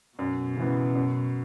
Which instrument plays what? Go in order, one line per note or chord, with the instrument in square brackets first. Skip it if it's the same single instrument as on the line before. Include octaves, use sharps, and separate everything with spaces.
[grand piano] F#2 [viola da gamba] B2
[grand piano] C#3 E3 B3
F#2